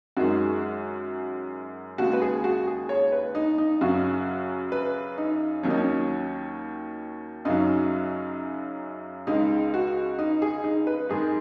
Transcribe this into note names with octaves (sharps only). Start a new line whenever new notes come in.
F#2 D#3 G#3 F#4
D#2 C#3 G#3 F#4
B4
G#4
F#4
G#4
C#5
B4
D#4
D#4
F#2 C#3 F#3 F#4
B4
D#4
D#2 D#3 F#3 C#4
D#4
C#4
F#2 C#3 F#3 D#4
C#2 C#3 G#3 D#4
F#4
D#4
G#4
D#4
B4
G#2 D#3 G#3 G#4